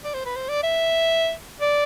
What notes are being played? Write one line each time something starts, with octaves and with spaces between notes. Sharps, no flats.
D5
C5
B4
C5
D5
E5
D5